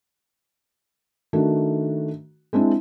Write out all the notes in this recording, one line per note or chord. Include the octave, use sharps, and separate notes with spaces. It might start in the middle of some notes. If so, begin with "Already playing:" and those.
D#3 A3 D4 F#4
G#3 C4 D4 E4